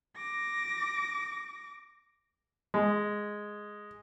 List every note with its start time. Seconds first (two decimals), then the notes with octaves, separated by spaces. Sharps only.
0.16 D6 A#6
2.74 G#3